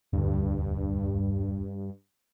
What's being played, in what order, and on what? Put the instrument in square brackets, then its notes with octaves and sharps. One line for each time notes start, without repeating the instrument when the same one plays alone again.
[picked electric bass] E1 D2 D3 [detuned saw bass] G2